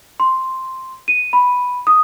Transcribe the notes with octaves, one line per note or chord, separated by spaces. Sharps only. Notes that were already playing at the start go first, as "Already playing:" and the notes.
C6
D#7
B5
D#6